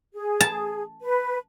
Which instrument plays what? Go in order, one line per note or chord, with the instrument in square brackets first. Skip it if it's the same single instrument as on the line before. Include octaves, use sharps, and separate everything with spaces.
[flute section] G#4
[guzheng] A5
[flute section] B4